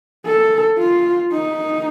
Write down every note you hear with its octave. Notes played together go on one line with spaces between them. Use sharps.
A4
F4
D#4